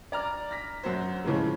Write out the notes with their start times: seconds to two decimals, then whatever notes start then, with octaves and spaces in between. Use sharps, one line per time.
0.12 D5 A#5 F6
0.51 A#6 B6
0.83 F#2 F#4 C5
1.24 A2 C#3 E3 F3 G#3